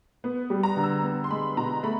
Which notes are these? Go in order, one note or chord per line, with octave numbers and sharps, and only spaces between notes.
B3
G3
A#5
D3
E6
B3
C6
G#3 B5
B2 A#5
A3 B5